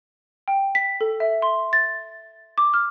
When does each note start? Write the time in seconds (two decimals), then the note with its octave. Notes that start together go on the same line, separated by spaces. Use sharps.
0.48 G5
0.75 B6
1.01 A4
1.20 E5
1.42 C6
1.73 A6
2.58 D6
2.74 F6